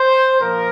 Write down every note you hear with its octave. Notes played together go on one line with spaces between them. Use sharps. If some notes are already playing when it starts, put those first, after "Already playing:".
Already playing: C5
A#2 F3 A#4